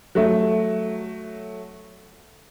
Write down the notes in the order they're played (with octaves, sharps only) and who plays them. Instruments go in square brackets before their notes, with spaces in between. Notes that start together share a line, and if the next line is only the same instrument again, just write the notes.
[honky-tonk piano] F#3 A3